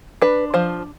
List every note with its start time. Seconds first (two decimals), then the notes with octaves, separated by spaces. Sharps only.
0.22 D4 B4
0.54 F3 C5